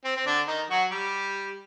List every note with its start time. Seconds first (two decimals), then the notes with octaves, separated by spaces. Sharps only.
0.04 C4
0.17 C4
0.26 D3 D4
0.48 D#3 D#4
0.70 F#3 F#4
0.91 G3 G4